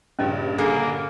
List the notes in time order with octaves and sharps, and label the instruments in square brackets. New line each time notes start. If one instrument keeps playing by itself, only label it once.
[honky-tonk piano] A#1 G2 C#3 [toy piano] C#4 D#5
[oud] D3 G#4 [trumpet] A#3